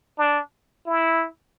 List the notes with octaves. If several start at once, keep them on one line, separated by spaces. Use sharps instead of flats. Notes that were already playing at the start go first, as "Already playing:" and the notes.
D4
E4